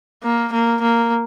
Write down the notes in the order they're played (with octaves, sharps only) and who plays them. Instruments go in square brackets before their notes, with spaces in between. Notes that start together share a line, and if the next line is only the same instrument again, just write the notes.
[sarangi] A#3
A#3
A#3